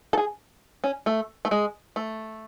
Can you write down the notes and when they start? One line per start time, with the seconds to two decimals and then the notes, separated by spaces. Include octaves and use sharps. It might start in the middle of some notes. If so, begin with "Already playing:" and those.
0.13 A4
0.17 G#4
0.84 C#4
1.06 A3
1.45 A3
1.51 G#3
1.96 A3